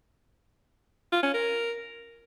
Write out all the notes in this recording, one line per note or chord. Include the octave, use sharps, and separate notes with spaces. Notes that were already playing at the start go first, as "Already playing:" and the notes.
F4
C#4
A#4